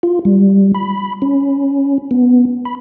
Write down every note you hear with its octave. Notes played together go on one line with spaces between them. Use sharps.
F4
G3
B5
C#4
B3
B5